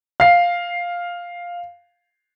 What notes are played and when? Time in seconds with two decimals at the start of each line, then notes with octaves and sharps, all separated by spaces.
0.20 F5 C7